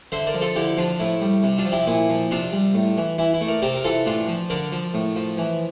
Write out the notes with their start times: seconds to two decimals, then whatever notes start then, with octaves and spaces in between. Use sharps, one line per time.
0.12 D3 C5 E5
0.27 A#4 D5
0.34 F3
0.41 F4 A4
0.56 D3 E4 G4
0.77 F3 D4 F4
1.00 A2 E4
1.21 G3
1.43 C3
1.58 D4 F4
1.65 F3
1.72 E4 G4
1.87 A#2 E4
2.09 F3
2.31 C3 D4 F4
2.53 G3
2.75 A2
2.97 E3
3.18 E3 E4
3.34 E4
3.41 A3
3.47 A#4 D5
3.62 C3 G4 A#4
3.75 A#4
3.84 E3 F4 A4
4.06 A2 D4 F4
4.28 F3
4.50 D3 A#4 D5
4.72 F3
4.94 A2
5.16 F3
5.38 E3